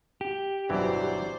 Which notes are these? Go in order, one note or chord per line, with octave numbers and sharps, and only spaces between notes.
G4
G1 B2 E3 F#3 C5 D5